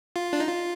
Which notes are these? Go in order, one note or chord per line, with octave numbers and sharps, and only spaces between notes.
F4
D4
D#4
F4